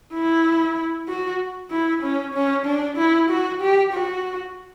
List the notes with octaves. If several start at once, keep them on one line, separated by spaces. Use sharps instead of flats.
E4
F#4
E4
C#4
C#4
D4
E4
F#4
G4
F#4